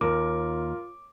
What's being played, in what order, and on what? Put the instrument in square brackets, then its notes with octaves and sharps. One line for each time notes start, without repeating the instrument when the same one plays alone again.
[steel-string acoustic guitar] D#2 [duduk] F4 [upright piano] A#4 [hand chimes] D6